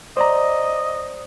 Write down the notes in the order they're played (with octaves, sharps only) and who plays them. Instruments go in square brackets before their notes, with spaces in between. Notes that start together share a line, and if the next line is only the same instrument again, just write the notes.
[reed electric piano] C5 D5 A#5 [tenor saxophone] D#5